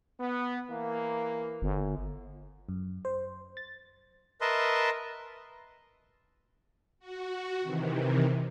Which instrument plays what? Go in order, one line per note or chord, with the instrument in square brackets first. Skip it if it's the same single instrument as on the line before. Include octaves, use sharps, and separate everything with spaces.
[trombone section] B3
E3 A#3
[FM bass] G1
[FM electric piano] F#2
C5
A6
[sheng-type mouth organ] A#4 B4 D#5 E5 A5 C6
[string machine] F#4
C3 D#3 E3